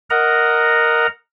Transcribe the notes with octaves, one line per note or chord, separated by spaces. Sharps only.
A#4 D#5 F#5 A#5